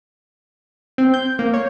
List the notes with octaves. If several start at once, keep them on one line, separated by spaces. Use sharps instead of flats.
C4
G6
A#3
C#5